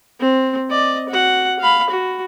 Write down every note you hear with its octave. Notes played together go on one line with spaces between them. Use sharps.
C4
D5 D#5
F#4 F#5
F5 B5
F#4